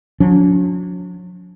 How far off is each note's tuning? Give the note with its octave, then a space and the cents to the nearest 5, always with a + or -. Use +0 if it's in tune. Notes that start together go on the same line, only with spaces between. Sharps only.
F#3 -40 D4 -45